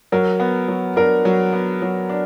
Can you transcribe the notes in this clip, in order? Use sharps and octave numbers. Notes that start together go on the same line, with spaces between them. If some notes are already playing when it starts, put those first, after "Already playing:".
F#3 A#4
B3
F#3
D4 A#4
F#3
B3
F#3
D4